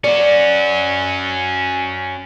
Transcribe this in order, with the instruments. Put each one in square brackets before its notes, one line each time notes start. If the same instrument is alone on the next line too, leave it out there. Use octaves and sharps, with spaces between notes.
[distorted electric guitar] C#4 F#4 [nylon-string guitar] D5